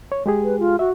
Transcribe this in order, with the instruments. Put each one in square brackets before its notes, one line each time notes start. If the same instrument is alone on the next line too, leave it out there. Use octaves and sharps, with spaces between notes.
[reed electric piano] C#5
G#3 G4 G#4
[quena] B4
F4
[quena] F#4 [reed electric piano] E5